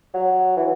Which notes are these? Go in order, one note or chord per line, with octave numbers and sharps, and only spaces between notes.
F#3
E3